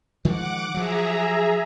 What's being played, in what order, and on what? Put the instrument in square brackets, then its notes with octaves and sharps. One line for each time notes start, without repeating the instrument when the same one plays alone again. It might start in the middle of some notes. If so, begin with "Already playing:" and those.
[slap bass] D#3 F3 G#3 [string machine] F#5 D6
[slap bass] F3 F#3 [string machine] G#4 E5 A#5